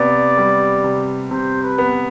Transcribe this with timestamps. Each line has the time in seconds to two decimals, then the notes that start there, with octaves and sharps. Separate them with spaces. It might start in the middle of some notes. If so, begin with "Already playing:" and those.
Already playing: C3 B3 D5
0.38 G3
0.84 C3
1.31 C3 C5
1.63 B4
1.78 B3